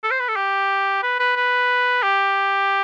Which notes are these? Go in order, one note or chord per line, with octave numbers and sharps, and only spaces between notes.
A4
C5
B4
A4
G4
B4
B4
B4
G4